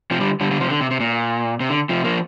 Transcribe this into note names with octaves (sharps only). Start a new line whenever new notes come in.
C3 F3
D3 G3
D3 G3
D3 G3
C3 F3
D3
C3
C3
A#2
C3
D3
C3 F3
F3 A#3